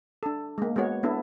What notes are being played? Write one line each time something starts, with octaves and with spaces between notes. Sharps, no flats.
D4 A4
G#3 A#3
G#3 B3 F#4 C#5
B3 D4 E4 A4